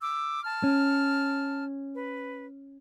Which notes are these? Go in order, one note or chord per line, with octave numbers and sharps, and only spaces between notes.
D6 E6
A5 F6
C#4
B4